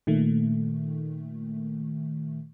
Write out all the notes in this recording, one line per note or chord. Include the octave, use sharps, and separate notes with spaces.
A#2 D#3 A3